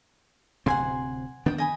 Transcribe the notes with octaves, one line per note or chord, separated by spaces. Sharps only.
D1 C3 C4 F#5 G#5 C6
D#3 B3 D4 D5 G5 D#6
D#5 G#5 B5